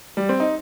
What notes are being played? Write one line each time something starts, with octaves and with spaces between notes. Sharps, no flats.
G3
C4
D#4